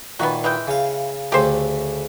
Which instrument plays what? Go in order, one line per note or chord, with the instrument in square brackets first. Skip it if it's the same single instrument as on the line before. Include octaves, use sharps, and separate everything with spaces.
[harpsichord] A#2 D#3 [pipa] B3 F#4
[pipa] E3 G#3 G5
[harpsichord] C#3 F5
[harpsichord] D2 C#3 A3 [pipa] G4 C5